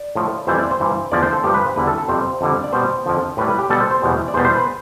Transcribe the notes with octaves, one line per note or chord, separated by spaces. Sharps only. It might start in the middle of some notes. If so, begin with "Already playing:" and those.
Already playing: D5
A2 F3
F2 E3 G3 C5
D5
C5
G2 E3 G3
E2 D3 F3 D5
C5
A4
G2 F3 G4
B4
C5
E2 D3 G3 B4
A4
A4
F2 C3 G3 C5
F2 D3 G3
D5
B2 G3 C5
F2 D3 F3
A2 G3 B4
B4
G4
B2 G3 A4
C5
C5
E2 B2 G3
D5
E2 B2 G3 C5
C5
B4